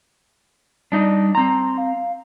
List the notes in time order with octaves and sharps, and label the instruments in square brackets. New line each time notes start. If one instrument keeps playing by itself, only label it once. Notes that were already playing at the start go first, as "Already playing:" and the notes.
[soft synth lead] G3 [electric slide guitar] D4 D#4 D#5
[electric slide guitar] C4 A#5 [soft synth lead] C6
[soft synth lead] F5